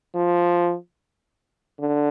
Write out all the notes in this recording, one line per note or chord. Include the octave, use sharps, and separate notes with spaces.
F3
D3